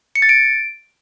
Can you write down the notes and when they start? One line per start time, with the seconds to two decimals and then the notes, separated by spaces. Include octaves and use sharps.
0.16 C#7
0.22 A6
0.29 D7